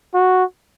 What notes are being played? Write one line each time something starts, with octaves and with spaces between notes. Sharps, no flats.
F#4